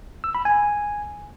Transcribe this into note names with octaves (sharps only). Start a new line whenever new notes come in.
E6
B5
G#5